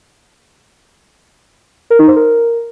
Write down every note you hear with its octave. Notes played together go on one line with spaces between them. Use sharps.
A#4
D#4
C5
A#4